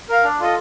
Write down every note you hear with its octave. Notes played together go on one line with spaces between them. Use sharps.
A#4 F5
D4
F4 A4 D#5